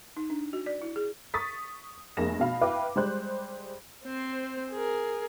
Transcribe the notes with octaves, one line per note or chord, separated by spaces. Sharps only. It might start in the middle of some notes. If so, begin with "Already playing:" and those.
D#4
D4
F#4
D5
E4
G#4
C#6 D#6 A6 B6
F1 A#3 G#4 A#6 E7
B2 F5 B5
E4 B4 F5 G5 D6
G3 G#3 C5 F#6
C4 C5
G#4 A#4